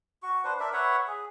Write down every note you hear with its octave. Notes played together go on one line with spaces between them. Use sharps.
F#4 C#6
D4 B4 C5
D4 A#4 D5 E5
B4 C#5 E5 F#5
G#4